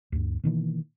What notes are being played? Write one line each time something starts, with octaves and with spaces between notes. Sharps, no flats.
D2 G2
B2 D#3 E3 A#3